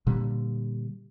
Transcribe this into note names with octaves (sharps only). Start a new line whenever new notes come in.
A#2 D3 G3